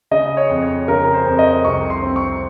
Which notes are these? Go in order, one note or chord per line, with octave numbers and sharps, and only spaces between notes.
C#3 D#5
C#5
F2
C#5
C#3 A#4
C5
F2
D#5
C2 C#6
C6
C4
C#6